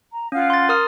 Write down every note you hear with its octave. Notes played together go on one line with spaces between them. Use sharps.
A#5
C#4 F4 F5 F#5
C6 A6
A#4 D#6 F6